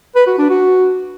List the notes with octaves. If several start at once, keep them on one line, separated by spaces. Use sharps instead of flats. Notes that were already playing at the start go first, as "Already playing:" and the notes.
B4
F#4
D4
F#4